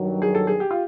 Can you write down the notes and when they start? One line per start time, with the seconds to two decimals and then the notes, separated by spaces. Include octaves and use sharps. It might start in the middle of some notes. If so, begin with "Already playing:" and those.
Already playing: G2 D#3 F#3
0.22 G#4
0.35 A4
0.47 G#4
0.60 G4
0.71 F4